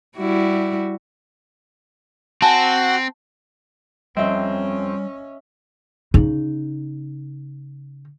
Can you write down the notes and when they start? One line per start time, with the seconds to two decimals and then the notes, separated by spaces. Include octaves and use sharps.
0.18 G3 E4 F#4
2.42 C4 F#4 G#5 A5
4.17 F2 G3 C4 C#4 D#5 E5
6.14 C#3 D#4